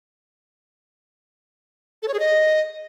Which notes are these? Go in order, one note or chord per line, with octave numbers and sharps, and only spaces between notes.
A4
C#5
G#4
D#5